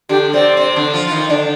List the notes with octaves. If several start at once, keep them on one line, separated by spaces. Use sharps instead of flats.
D3 D4 G4
C3 C4 D5
C3 C4
D3 D4
F3 F4
F4
D#3 D#4
D3 D4 D5